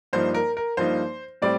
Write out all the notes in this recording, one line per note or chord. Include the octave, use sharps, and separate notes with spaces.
G2 F3 A#3 D#4 C5
A#4
A#4
G2 F3 A#3 D#4 C5
A2 G3 C4 D5